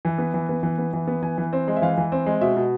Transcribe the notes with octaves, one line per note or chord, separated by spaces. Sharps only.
E3
B3
E3
B3
E3
B3
E3
B3
E3 G#5
E3
C4
G#3
E5
E3 F5
E3
C4
G#3
B2 E5
B2